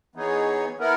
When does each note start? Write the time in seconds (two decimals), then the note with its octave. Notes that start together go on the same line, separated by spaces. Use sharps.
0.15 E3 B3 D#4 G#4 C#5
0.79 B3 E4 A#4